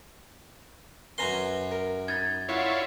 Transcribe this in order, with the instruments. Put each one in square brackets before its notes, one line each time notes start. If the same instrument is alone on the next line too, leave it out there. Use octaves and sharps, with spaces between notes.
[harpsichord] F#2 C#4 C6 [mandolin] B4 G#5 A#5
[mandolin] A#4
[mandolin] D#4 B5 [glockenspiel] G#6 A6
[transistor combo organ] E4 F4 C#5 [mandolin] D5 F#5